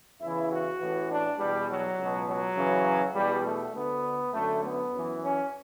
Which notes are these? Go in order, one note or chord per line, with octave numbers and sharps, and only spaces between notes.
E2 C#3 E3 E4
F#4
A1 A2 E3
D4
E2 B2 G3
F#3
C#2 B2
F#3
F#2 C#3 E3
E2 B2 G3
A3
D2 D3 B3
F#2 D3 A3
B3
F#2 E3
C#4